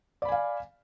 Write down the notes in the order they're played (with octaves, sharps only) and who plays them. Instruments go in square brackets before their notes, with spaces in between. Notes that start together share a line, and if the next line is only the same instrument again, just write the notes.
[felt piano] D5
B5
G#5
F5